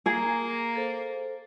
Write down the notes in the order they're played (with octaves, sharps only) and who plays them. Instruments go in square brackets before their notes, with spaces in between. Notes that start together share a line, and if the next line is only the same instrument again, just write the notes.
[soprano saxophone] A#3 [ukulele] G#4 [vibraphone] A#5
[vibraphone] A4 C5